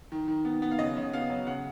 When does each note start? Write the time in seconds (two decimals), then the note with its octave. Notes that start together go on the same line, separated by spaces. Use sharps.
0.12 D#3
0.28 D#3
0.45 B3
0.62 B3
0.71 F5
0.79 C#3 D#5
0.97 C#3
1.13 B3 F5
1.30 F#3
1.47 C#3 F#5